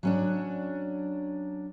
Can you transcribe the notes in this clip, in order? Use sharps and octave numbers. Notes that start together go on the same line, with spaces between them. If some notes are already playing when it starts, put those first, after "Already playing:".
F#3 C#4 D4